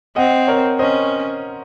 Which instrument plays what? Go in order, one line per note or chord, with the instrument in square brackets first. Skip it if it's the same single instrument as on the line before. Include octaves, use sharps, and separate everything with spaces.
[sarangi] C4 [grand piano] D#5 F#5
[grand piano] A#4 C#5
[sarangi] C#4 [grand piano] C5 D#5